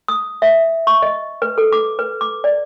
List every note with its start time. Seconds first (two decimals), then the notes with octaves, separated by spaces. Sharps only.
0.08 D#6
0.42 E5
0.87 C#6
1.02 D#5
1.42 B4
1.58 A4
1.72 D6
1.99 B4
2.21 D6
2.44 D5